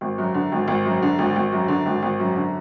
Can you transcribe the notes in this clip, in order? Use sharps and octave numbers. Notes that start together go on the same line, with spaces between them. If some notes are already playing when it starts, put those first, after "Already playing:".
G#1
F#2
D3
G#1
G#1
F#2
D3
G#1
G#1
F#2
D3
G#1
G#1
F#2
D3